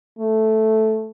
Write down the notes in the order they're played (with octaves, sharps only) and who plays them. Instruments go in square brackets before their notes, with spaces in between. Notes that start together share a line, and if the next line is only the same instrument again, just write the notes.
[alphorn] A3